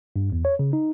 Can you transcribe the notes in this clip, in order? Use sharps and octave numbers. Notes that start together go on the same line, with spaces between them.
G2
E2
C#5
C#3
D#4